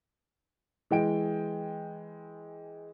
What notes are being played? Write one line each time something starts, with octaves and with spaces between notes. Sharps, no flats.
E3 G#3 G5 D7